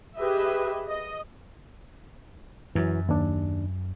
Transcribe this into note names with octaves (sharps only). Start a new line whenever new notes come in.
G4 G#4 B4 D#5 E5
D#5
F#2 E3 F#3
D#2 D4